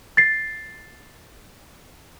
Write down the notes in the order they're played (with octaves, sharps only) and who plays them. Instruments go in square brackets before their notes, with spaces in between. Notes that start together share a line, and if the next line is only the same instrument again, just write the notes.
[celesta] A6 C7